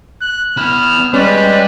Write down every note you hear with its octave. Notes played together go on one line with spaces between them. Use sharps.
F#6
B3 E4 F6
G3 G#3 C#4 G4 B4 D5